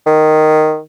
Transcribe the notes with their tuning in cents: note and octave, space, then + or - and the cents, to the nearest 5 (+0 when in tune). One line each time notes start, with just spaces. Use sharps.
D#3 -5